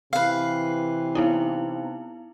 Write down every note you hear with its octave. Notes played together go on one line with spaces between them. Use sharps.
C3 E3 B4 F5 C7
B3 D#4 E4